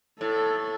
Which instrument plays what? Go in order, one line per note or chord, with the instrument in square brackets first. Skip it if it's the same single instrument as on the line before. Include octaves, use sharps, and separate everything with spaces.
[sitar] A2 [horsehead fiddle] A4